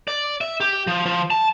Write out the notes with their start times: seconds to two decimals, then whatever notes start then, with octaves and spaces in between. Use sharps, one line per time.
0.08 D5
0.41 E5
0.60 G4
0.87 F3
1.06 F3
1.30 A5